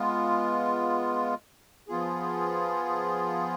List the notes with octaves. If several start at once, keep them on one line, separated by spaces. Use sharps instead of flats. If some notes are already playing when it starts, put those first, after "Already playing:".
Already playing: G#3 B3 F4
F3 B3 F4 G#4